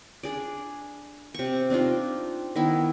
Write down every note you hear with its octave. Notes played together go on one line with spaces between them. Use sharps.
D4 G#4 D5
C3 C#6
C4 D4 D#4 F4
D#3 B3 E4